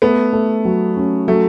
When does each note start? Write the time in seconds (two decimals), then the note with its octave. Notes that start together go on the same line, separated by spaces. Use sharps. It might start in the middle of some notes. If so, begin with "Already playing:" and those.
0.02 A3 B3
0.33 A3
0.65 F#3
0.97 C#4
1.28 F#3 A3